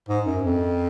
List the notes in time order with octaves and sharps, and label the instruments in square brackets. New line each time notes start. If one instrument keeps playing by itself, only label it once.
[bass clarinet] G#2
F#2
F2